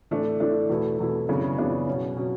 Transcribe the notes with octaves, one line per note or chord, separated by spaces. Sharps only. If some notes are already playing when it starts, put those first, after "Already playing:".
A2 E3 A3 D4
A2 E3 A3 D4
E2 B2 A3 E4
E2 B2 A3 E4
F#2 C#3 E3 B3 D4
F#2 C#3 E3 B3 D4
B2 F#3 C#4
B2 F#3 C#4